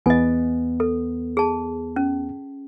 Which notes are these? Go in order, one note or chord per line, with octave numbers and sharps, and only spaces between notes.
E2 B3 D#5 G#5
A4
G#4 A5
C#4